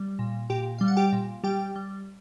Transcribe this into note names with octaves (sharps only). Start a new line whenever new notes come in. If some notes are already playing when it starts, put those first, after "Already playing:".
Already playing: G3
A#2
A#2 G4 G5
G3 F5
F#5
G4 G5
A#2
G3 G4 G5
G3